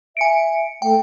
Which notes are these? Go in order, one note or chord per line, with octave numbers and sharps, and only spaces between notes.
E5 G#5 C#7 D7
A3 G5